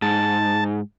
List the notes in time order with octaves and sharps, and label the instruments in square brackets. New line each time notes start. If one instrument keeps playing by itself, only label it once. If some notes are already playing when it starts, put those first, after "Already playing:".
[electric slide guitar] G#2 [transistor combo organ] A5